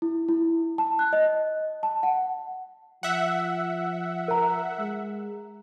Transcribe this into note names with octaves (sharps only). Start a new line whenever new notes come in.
E4
E4
A5
F#6
D#5
A5
F#5
F3 E5 F#5
A#4 A#5
G#3